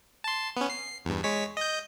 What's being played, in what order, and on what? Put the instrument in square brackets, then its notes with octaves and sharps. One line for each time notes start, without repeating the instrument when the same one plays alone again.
[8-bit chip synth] A5 C6
B3 C#4
C7
E2 G2
G#3 C#5 B6
D#5 G6